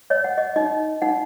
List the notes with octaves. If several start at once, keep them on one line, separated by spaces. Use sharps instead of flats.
C#5 D#5
F#5
D#5
D#4 D#5
D#4 F#5